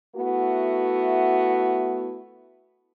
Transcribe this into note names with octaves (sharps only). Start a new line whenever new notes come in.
A3 B3 E4 F#4